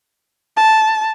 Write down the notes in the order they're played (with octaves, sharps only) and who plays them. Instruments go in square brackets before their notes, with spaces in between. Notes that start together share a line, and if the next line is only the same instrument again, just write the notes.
[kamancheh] A5